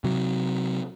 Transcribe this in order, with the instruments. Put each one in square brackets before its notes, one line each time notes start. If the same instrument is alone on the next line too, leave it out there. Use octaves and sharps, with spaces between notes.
[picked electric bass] C3 F#3